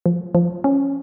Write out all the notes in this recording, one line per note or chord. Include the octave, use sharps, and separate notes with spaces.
F3
F3
C#4